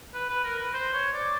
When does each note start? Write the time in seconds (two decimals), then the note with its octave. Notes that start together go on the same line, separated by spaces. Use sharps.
0.14 B4
0.29 B4
0.44 A#4
0.58 B4
0.74 C5
0.94 C#5
1.13 D5